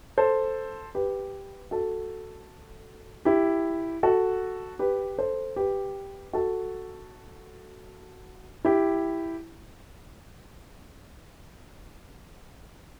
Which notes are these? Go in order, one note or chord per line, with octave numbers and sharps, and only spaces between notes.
A4 C5
G4 B4
F#4 A4
E4 G4
F#4 A4
G4 B4
A4 C5
G4 B4
F#4 A4
E4 G4